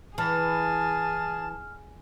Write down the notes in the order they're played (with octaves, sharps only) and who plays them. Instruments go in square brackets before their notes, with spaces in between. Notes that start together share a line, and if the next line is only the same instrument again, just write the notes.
[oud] E3 [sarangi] G#4 [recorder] A5 [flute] F6